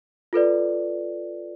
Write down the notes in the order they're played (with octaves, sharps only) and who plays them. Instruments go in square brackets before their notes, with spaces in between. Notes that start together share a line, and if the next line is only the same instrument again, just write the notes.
[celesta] F4 A4 B4 D5